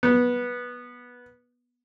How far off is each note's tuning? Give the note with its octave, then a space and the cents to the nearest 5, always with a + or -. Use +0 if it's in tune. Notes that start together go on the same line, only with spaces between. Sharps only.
B3 -15